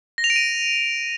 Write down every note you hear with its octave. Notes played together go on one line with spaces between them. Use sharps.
A#6
F7
D7
D#7